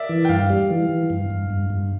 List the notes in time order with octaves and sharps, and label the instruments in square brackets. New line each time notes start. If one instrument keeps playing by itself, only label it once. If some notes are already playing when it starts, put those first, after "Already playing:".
Already playing: [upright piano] A#4 D5 E5
[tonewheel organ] E3
[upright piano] G5
[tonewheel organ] G2 [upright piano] F5
[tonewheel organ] G3
E3
E3
G2
G2
G2
G2